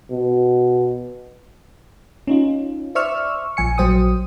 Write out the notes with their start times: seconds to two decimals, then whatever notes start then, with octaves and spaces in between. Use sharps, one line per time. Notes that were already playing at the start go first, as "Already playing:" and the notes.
0.12 B2
2.27 C#4 D#4 F4
2.95 C5 D5 E5 C#6 E6 F6
3.57 A#1 F3 G#5 C#7
3.78 A#1 F#3 C5 G5 D#6